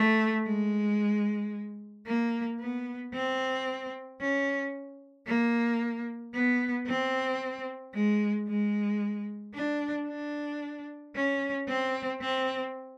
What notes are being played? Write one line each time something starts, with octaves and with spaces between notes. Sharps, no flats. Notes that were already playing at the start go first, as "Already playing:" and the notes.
Already playing: A3
G#3
A#3
B3
C4
C#4
A#3
B3
C4
G#3
G#3
D4
D4
C#4
C4
C4